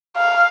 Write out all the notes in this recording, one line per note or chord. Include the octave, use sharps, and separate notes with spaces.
F5